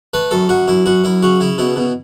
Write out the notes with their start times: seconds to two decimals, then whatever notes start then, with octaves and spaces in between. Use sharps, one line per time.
0.14 A3 B4
0.31 F#2 A4
0.49 F#2 F#4
0.68 F#2 E4
0.86 F#2 F#4
1.04 F#2 E4
1.23 C#3 F#4
1.40 C#3 E4
1.58 B2 E4
1.76 B2